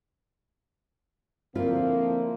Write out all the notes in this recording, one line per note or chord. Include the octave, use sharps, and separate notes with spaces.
D3 F3 A#3 C4 E4 F4